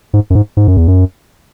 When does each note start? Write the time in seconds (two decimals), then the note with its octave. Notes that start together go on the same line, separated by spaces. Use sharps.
0.13 G#2
0.30 F#2
0.35 G#2
0.57 G#2
0.68 F#2
0.77 E2
0.88 F#2